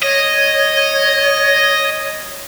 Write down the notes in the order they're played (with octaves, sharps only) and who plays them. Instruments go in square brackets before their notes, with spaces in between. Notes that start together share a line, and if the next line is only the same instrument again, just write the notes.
[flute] C#5 [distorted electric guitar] D#5